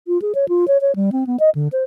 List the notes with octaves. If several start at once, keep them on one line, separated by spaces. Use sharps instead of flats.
F4
G#4
C#5
F4
C#5
C#5
G3
C4
B3
D#5
D3
C5